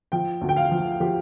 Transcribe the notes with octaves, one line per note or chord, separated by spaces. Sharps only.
F3 G5
D2
G5
F5
F3
F3 G4